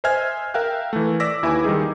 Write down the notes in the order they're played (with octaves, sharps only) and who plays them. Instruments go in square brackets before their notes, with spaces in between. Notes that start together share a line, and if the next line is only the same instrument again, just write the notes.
[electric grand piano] C5 D#5 E5 G#5 F6 G#6
A#4 E5 F5 G5 F#6
E3 A3
D5 D6 E6 A#6 B6
D#2 E4 B4 G#5 D6
D#3 G3 D#4 G#4